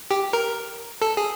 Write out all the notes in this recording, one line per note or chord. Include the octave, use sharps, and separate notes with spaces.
G4
A#4
A4
G#4